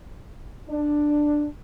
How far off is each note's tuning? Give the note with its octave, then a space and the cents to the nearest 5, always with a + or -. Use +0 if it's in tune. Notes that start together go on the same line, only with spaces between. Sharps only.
D4 +10